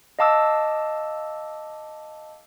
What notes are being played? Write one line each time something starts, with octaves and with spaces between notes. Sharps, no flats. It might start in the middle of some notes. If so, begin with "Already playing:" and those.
D#5 F5 A5 D6 E6